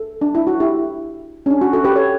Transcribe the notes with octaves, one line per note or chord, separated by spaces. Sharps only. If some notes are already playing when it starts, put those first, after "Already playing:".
Already playing: A4
D4
E4
F#4
E4 G4
C#4
D4
F#4
F#4 A4
G4 B4
A4 C#5